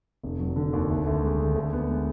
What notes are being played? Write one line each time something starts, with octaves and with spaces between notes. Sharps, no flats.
F1
F#3
D3
D#2
D2
D2
G#3
D3
D2
B3
G#3